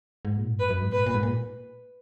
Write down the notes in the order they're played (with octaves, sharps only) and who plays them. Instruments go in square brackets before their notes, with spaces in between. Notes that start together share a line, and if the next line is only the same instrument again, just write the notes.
[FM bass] G#2
A#2
G#2
[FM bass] F#2 [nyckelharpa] B4
[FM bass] F#2
G#2
[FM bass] A#2 [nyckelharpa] B4
[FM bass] G#2
A#2
G#2
A#2